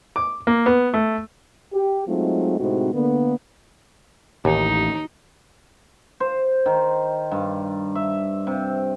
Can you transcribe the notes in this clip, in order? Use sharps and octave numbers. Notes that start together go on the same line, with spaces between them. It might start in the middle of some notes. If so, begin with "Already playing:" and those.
D6
A#3
B3
A3
G4
F#3 G#3 A3 C4 D#4 F4
A2 C3 G#3 C4 D#4 F#4
D3 A#3 B3
A1 D#2 D#4
C5
D#3
G2
E5
C3